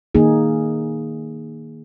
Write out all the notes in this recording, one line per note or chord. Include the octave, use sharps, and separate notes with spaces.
D#3 A#3 D#4 G#4